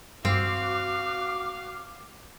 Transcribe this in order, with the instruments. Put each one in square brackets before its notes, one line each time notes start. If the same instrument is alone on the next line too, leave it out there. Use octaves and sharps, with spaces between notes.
[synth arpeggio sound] G2 [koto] C4 [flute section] F#4 D6 [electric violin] F5